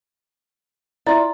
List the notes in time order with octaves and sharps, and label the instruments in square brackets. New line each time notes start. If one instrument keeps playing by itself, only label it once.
[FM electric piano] E4 [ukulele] F4 D5 [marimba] A#5